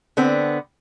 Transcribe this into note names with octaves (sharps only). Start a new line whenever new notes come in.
D3 B3 C4